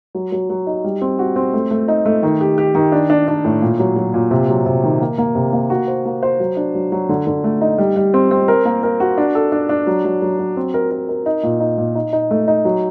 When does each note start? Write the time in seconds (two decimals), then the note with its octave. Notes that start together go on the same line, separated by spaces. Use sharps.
0.15 F#3
0.32 F#3
0.50 F#3
0.67 D#4
0.84 G3
1.02 C4
1.19 F#4
1.36 C4
1.53 A3
1.71 A3
1.88 D#4
2.06 A3
2.23 D#3
2.41 G4
2.58 G4
2.75 D#3
2.92 D4
3.10 D4
3.28 D4
3.44 A2
3.62 A#2
3.79 F#3
3.96 F#3
4.14 A#2
4.31 C3
4.49 F#3
4.66 C3
4.84 D#3
5.01 A#3
5.18 A#3
5.35 C3
5.53 A#3
5.70 F#4
5.88 C5
6.05 A#3
6.23 C5
6.40 F#3
6.57 D4
6.75 F#3
6.92 F#3
7.09 D3
7.27 D3
7.44 A3
7.61 D#4
7.78 G3
7.96 G3
8.14 C4
8.31 C4
8.48 A#4
8.65 A#3
8.83 A#4
9.00 F#4
9.18 D4
9.35 A4
9.52 D4
9.69 D4
9.87 F#3
10.05 F#3
10.22 F#3
10.39 F#3
10.57 C4
10.74 A#4
10.91 A#4
11.09 A#4
11.26 D#4
11.43 A#2
11.60 D#4
11.78 A#2
11.95 D#4
12.13 D#4
12.31 A3
12.48 D#4
12.65 F#3